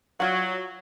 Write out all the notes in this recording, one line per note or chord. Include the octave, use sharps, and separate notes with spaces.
F#3 F4 D5 F#5